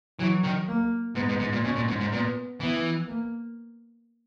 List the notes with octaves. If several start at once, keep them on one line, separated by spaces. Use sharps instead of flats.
E3 F#3
D#3
A#3
G#2 B3
G#2
G#2
A#2
B2 C#4
A#2
G#2
G#2
A#2 B3
E3 B3
A#3